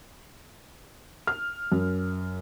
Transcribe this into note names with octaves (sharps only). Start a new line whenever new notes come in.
F6
F#2